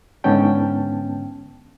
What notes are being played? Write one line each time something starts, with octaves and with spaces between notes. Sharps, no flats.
G#2 D3 B3 C#4 G5 A5